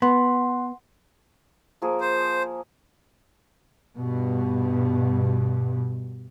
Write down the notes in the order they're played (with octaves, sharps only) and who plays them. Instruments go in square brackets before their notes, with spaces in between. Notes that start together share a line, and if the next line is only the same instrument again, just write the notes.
[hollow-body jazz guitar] B3 [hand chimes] F#5 C6
[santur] F3 A#3 G#4
[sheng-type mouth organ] C5
[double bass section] G2 B2